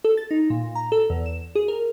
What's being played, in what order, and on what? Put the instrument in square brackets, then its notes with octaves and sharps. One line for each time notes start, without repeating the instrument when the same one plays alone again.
[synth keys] A4
A6
D#4
A#2
A#5
A4
E2
E7
G#4
A#4